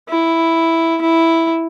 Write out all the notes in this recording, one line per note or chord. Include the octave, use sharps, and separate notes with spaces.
E4
E4